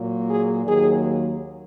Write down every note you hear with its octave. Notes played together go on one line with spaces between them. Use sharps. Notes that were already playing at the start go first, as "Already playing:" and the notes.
Already playing: A#2 F#3 A#3
G#4
D#2 D#3 F#3 A#3 G#4